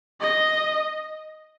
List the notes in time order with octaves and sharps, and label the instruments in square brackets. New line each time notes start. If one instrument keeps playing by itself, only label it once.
[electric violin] D#5